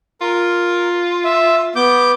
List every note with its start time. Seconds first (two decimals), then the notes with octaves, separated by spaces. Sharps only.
0.21 F4 A#4
1.24 E5
1.76 B3 D6 G6